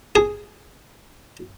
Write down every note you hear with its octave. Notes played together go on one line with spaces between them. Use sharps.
G#4